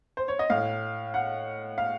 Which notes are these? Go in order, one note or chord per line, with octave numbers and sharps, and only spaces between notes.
C5
C#5
D#5
A2 F5
F#5
F5